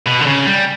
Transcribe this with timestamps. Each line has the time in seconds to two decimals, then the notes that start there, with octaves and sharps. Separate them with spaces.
0.06 B2
0.20 D3
0.26 C#3
0.46 G3